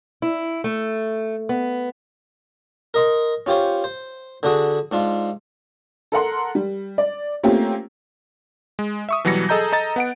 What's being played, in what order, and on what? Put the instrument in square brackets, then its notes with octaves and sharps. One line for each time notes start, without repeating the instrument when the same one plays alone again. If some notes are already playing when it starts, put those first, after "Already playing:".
[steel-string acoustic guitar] E4
A3
B3
[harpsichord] A#4 D#5 C6
C#4 F4 G4 C5 C#5
C5
D3 D4 F#4 G#4
G#2 D4 F4 C6
[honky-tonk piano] A4 A#4 F#5 C6
G3
D5
A3 A#3 C4 C#4 F4 G4
[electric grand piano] G#3
E5 C#6 D#6
B2 E3 F#3 G3 A#6 C#7
G#4 A4 D#5 A#5 G6
A4 D#5 A#5 A6
B3 F#5 D7